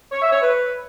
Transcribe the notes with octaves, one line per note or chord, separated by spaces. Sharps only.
C#5
E5
C#5
B4